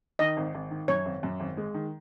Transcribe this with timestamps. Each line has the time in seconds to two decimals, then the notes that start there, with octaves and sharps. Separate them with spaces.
0.19 D#3 D#5
0.37 G#1
0.54 G#1
0.71 D#3
0.88 F#2 C#5
1.05 G#1
1.23 F#2
1.40 G#1
1.57 G#3
1.74 D#3